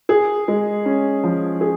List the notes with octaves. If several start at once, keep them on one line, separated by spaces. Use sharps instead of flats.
G#4
G#3
C#4
F3
G#4